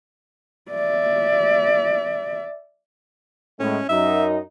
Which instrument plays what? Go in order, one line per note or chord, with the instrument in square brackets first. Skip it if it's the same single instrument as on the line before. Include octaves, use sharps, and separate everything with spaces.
[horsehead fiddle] D5 E5
[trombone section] A2 G#3 [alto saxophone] C#4
[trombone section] F#2 D#4 [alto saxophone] E5